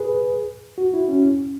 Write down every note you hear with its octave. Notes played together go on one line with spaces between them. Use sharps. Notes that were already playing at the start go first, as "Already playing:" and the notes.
Already playing: G#4 B4
F#4
E4
C#4
C#4